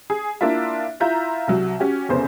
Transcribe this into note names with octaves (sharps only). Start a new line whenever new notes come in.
G#4
A#3 D4 E4 F4 E5
E4 F4 E5 A#5 G6
C2 F#3
C#4 F#4 G4
F1 E2 C#3 B3 C5